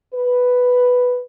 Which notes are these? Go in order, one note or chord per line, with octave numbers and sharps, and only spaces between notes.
B4